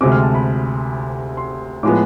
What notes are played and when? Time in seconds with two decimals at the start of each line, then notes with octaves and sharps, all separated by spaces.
0.01 D2 C3 G#3 C4 D6
0.12 F6
0.23 A5
0.35 B5
1.37 C6
1.83 A2 F3 G#3 B3 D6